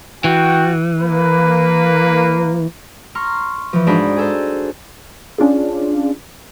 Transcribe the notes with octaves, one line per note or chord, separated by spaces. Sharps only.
E3 F#4 G5
A#3 B4
A#5 C6 C#6 F6
E3 F3
G#2 D4 D#4 F#4 C5 B5
G#4 A4 C5
C#4 D4 F4 G#4